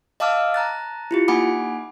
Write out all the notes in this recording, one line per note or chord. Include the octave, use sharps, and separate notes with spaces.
D#5 F5 A5 D6 E6 F6
A5 A#5 F#6 A6
E4 F4 G4
A#3 D#4 F#5 G#5 B5 D6